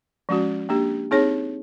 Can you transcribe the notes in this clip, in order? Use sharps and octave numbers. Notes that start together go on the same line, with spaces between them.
F3 G#3 C#4 F#4
A#3 D4 G4
C4 D#4 G#4 C#5